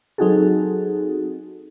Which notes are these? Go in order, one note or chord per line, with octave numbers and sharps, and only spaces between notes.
F#3 C4 D#4 F#4 G#4 A4